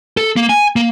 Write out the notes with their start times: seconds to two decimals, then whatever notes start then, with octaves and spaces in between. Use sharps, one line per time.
0.17 A4
0.36 A#3
0.49 G#5
0.76 A#3